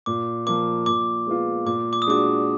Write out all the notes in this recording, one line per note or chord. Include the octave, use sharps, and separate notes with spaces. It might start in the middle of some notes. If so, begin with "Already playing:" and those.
A#2 D6
F3 A#3 D6
A#2 D6
G#3 B3 F4
A#2 D6
D6
D#6
G#3 D4 F#4 D6